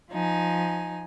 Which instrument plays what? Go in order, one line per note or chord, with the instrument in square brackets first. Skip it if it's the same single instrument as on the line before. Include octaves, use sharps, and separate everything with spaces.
[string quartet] F3 D#4 G#5